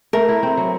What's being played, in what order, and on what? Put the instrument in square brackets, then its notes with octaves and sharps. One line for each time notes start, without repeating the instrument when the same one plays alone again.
[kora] A3 [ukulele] A#4
[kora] E4
C4
F#3